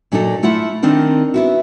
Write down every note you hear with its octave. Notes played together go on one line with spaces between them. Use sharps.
A#2 F#3 D4 D#4 G#4 A4
A3 E4 F4 F#5
D#3 C4 D4 D#4 A#4
B3 E4 F#4